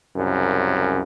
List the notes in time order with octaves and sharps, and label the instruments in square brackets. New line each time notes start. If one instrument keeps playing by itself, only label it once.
[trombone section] C2 F#2 C#3